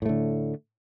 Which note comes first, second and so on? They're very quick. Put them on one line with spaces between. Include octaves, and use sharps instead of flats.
A2 A3 D3